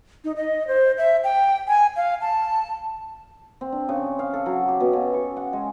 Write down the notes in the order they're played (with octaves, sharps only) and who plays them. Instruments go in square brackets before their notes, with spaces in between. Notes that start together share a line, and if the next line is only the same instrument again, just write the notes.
[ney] D#4
D#5
C5
E5
G5
G#5
F5
A5
[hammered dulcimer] C4
D4
C#3
F5
A4
F#3
G4
B2
C#3
C#6
F#5
G#3